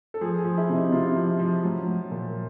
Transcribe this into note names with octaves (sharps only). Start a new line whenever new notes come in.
A4
F3 G#4
G#4
F3
E4
C3
D#4
C3 F4
F3
F3
F#3
F#3
A#2